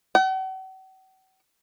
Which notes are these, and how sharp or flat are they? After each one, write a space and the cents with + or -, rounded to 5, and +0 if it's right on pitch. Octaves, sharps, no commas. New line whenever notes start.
F#5 +45